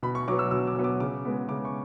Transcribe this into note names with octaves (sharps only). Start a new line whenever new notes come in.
B2 B5
C#6
F#3 B3 D6
E6
B2 E6
D6
F#3 B3
D6
C#3 D6
G#3 B3
C#3 D6
C#6